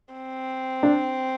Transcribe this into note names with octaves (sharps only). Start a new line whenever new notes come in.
C4
D4